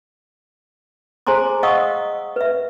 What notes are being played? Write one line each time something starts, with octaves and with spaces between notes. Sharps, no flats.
G#4 C5 G#5 A#5 C6 D6
D#5 F5 F#5 C#6 D#6 E6
B4 E5